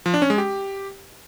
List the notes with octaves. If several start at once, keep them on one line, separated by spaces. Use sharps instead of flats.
F3
D4
C#4
G#3
G4